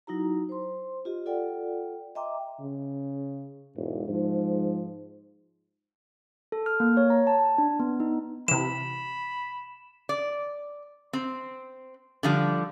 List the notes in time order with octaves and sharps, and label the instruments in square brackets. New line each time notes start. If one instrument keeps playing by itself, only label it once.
[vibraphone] F#3 D#4 E4 F#4 A#5
C5 C6
F4 G4 D#5
F4 A4 D5 F#5 G5
D#5 E5 G5 A#5 C6 D6
[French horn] C#3
[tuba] E1 [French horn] G#2
[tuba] G#2 [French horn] F3
[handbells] A4
F6
A#3
C#5
A#5
A5
D4
B3
D#4
[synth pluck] C3 E3 [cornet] B5 [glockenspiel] E7
[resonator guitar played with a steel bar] D5
C4
D3 F3 G3